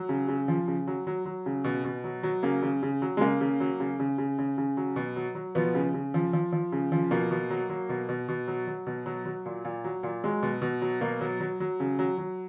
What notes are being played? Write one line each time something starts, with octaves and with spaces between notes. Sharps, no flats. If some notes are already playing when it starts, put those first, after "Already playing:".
Already playing: F#3
C#3
C#3
F3
C#3
F#3
F#3
F#3
C#3
B2
B2
F#3
F#3
C#3 A#3
C#3
C#3
F#3
G#3
C#3 A#3
C#3
F#3
C#3
C#3
C#3
C#3
C#3
F#3
B2
F#3
F#3
B2 F3 B3
C#3
C#3
F3
F3
F3
C#3
F3
B2 A#3
B2
F#3
F#3
B2
B2
B2
F#3
F#3
B2
F#3
F#3
A#2
A#2
F#3
A#2
F#3 G#3
B2
B2
F#3
B2 A#3
F#3
F#3
F#3
C#3
F#3
F#3